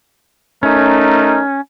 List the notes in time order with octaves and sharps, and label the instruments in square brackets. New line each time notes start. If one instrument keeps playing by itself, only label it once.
[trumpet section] A3 D#4 A#4 [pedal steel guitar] C#4